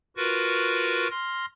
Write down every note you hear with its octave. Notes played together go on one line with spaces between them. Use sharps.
F4 F#4 A#4 B4 C#6
C6 F6 A#6